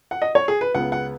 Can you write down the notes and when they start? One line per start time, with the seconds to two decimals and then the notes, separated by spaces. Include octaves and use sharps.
0.11 F#5
0.22 D#5
0.35 C#5
0.48 G#4
0.61 B4
0.74 C#2 C#3 B3 F#5
0.92 F#5